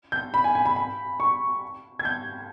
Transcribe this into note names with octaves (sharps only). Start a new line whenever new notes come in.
G6
B5
G#5
G#5
B5
B5
C#6
G#6
G6